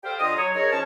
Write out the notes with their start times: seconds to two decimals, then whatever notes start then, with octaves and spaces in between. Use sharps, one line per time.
0.03 G4 A4 C5 F5 G5
0.20 D3 F4 D#5 D#6
0.37 F#3 C#5
0.54 D#4 G#4 A#4 C#5
0.71 F3 C#4 C#5 A5